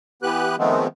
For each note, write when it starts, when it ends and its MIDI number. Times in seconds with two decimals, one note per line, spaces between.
0.22 0.56 52
0.22 0.56 59
0.22 0.56 67
0.22 0.56 71
0.22 0.56 90
0.58 0.87 51
0.58 0.87 53
0.58 0.87 56
0.58 0.87 57
0.58 0.87 59
0.58 0.87 60